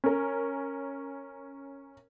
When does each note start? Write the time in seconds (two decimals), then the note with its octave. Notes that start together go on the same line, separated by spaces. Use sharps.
0.04 C#4 A#4